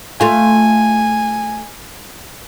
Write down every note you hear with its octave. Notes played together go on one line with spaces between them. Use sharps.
A3 F4 G#5